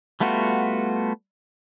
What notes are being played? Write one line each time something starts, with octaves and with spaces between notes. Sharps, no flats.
G3 A3 B3 F4 F#4